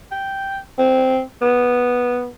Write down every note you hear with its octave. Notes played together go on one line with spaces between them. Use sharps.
G5
C4
B3